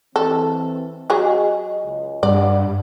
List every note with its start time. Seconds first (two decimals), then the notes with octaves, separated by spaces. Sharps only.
0.16 E3 C4 A4
1.10 F#3 G#4 D#5
1.85 C#2
2.23 G2 D5 F#5